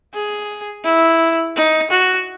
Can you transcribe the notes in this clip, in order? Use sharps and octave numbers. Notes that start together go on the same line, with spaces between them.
G#4
E4
D#4
F#4